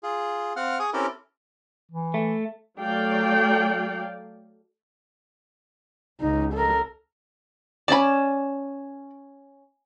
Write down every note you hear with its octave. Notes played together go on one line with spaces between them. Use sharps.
F4 G#4
C4 F5 F#5 F6
G#4 G#5 C#6 D#6
C4 C#4 E4 G4 A4 A#4
E3
A3
F#3 A3 A4 D5 F5 G5
C#2 D#4
A4 A#4
C#4 D5 A5 B5